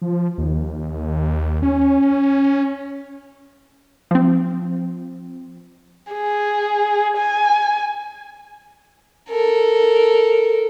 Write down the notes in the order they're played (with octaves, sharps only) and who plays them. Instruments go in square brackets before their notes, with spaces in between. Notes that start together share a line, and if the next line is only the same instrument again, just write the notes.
[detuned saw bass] F3
D#2
C#4
[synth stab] F3 C4
[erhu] G#4
G#5
[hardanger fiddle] A4 A#4